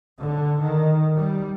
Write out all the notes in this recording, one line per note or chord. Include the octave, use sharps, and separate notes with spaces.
D3
D#3
G3